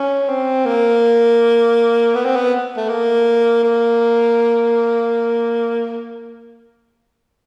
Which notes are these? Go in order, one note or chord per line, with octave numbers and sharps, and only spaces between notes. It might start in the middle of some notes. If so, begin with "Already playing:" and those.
Already playing: C#4
C4
A#3
B3
C4
B3
A3
A#3
A#3